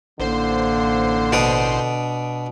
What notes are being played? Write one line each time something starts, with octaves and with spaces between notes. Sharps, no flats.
A1 D3 A#3 C5 C7
B2 D4 D#6